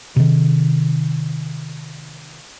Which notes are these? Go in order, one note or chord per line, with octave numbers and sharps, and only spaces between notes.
C3 D#3